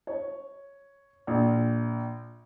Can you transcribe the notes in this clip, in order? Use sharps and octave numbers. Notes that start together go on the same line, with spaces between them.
C#5
A#1